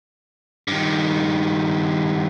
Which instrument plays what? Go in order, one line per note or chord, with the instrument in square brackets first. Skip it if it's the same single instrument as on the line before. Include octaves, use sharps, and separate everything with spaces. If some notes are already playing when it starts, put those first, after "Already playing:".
[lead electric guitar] G2 D#3